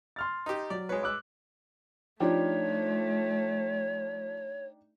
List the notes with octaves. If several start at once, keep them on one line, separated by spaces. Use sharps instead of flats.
C6 F6 A6
D#4 G4
F#3 D5
G#3 F#4 B4 C#5
D6 E6 F#6
F3 A3 D4 D#4 G4 C#5